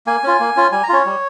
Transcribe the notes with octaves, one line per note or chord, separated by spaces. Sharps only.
A#3 G#5
C#4 F4
A#3
C#4 F4
G3 G#5
A#5
C#4 F4 C#5
G3